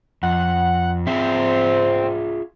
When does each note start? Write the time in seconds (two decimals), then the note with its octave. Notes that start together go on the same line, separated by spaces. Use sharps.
0.23 F2 F#5
1.07 C4 F4 G#4 E5